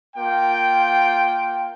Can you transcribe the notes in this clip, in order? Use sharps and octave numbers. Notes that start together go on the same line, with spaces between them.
A#3 F4 G5